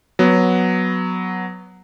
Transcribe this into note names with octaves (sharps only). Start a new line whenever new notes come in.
F#3 B3